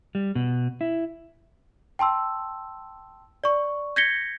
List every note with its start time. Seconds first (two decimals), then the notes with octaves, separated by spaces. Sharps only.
0.15 G3
0.35 B2
0.81 E4
1.99 G5 A5 C6 E6
3.44 D5 C#6
3.96 G6 G#6 A#6 B6 C#7 G7